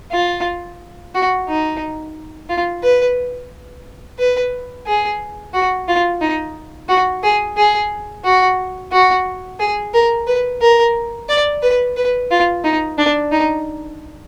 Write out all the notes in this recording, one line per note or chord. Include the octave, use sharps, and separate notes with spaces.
F4
F#4
D#4
F4
B4
B4
G#4
F#4
F4
D#4
F#4
G#4
G#4
F#4
F#4
G#4
A#4
B4
A#4
D5
B4
B4
F4
D#4
D4
D#4